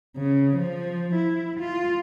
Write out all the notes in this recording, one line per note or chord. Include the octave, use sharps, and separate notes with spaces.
C#3
F3
E4
F4